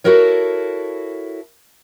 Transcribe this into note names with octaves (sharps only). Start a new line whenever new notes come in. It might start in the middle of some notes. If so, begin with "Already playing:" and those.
E4 F#4 A4 A#4 C#5